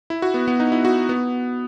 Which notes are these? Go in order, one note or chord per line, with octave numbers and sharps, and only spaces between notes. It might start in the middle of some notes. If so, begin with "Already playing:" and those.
E4
F#4
B3
B3
D#4
E4
F#4
B3